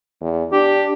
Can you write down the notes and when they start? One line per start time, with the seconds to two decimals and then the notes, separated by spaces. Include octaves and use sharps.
0.21 E2
0.53 D4 G4